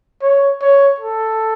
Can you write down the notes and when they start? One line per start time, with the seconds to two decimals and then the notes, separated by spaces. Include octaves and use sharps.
0.22 C#5
0.61 C#5
1.00 A4